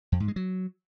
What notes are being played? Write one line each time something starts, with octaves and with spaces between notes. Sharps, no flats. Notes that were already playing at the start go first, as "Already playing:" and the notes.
F2
G#2
G#3
F#3